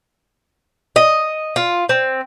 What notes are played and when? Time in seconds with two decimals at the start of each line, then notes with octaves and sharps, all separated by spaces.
0.96 D#5
1.56 F4
1.89 C4